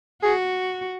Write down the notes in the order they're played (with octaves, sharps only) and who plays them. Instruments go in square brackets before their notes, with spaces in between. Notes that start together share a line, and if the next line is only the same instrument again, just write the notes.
[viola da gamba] F#4 [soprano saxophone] G#4